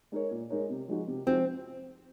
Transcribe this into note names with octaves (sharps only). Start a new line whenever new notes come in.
G#3 D#4 A#4 C#5
A#2
G#3 D#4 A#4 C#5
C3
F3 G#3 D#4 F#4
C3
F3 G#3 C4 D#4 F#4